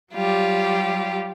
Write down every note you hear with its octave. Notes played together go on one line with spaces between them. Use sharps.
F#3 G3 F4 G4